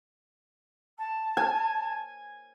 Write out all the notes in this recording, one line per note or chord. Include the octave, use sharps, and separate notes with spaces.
A5
G#5